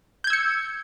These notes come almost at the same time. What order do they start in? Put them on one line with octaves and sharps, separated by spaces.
G6 G#6 E6 C#7